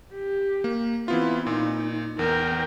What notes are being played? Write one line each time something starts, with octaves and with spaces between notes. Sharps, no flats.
G4
A#3
E3 B3 C4 E4 F4
A#2 D#4
E2 A#4 G5